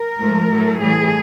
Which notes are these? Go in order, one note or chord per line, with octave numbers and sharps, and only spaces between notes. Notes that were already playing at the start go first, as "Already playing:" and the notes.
Already playing: A#4
G#2 F3 A3
A2 F#3 A3
A2 E3 G3 G#4